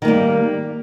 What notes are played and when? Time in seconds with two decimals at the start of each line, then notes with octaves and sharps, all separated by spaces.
0.02 D#3
0.05 A#3
0.08 G3